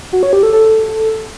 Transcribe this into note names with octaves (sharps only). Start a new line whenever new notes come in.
F#4
C#5
G4
A4
A4